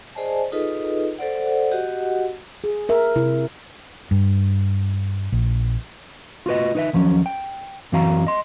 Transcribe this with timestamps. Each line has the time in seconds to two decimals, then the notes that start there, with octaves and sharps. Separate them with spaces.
0.15 G#4 C5 D5 D#5 G#5 A5
0.52 D#4 F4 G#4 A4 B4 D#5
1.19 A4 C5 D5 F#5
1.71 F#4 G4 D#5 F#5
2.64 G#4
2.89 A#4 E5
3.16 C3 E4
4.11 G2
5.32 A#1
6.46 F4 F#4 B4 D#5
6.75 D#4 B4 E5
6.93 D#2 F3 F#3 C#4
7.26 G5
7.92 F#2 E3 C4 F#4 F5 A#5
8.27 D#5 C6